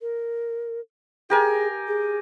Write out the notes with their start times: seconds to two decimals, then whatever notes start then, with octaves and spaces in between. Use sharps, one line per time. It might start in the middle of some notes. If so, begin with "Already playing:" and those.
0.01 A#4
1.30 G4 G#4 A#4 G#5
1.88 G#4